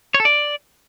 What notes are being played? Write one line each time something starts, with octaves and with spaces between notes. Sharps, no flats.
C#5
A4
D5